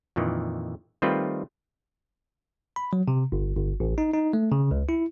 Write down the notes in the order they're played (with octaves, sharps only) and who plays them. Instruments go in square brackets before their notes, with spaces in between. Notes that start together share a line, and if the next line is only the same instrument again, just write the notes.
[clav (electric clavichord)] F2 A#2 D#3 E3
D#3 G3 A3 C4 F4 B4
[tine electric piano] B5
F#3
C3
G1
G1
A1
D#4
D#4
A3
C#3
C#2
E4